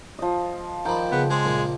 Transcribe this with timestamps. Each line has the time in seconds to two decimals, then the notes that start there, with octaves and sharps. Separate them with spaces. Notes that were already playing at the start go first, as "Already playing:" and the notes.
0.19 F3 D#5
0.85 D#3 F3 D5 G5 A#5 B5
1.12 C#3 B3 G#4
1.30 G#3 C4 C5 D5
1.45 A#1 F3 A#3